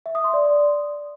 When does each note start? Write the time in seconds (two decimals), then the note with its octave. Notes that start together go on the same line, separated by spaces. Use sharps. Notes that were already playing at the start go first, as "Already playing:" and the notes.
0.06 E5
0.15 D#6
0.24 C6
0.34 D5